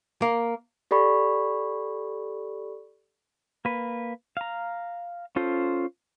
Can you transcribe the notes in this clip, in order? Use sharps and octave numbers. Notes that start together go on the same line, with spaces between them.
A#3
G4 A4 D5 B5 C#6
A#3 B4
F5 A#5
C#4 F4 A4 C5